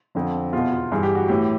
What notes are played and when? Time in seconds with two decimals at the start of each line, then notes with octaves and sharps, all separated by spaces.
0.15 F2 D3 F3
0.53 E2 B2 F4
0.72 F4
0.92 G2 E3 G#4
1.03 G4
1.15 F#4
1.28 A2 E3 G4